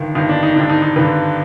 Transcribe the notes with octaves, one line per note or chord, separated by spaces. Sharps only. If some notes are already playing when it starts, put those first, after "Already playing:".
Already playing: G1 G2 D#3
G1 G2 D#3 D#4
D4
D#4
G#1 G2 D3 D4
D#4
D#4
G#1 G2 D3 B4